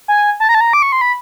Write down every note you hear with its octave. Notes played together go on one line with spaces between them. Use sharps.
G#5
A5
A#5
A5
A#5
D6
C#6
C6
B5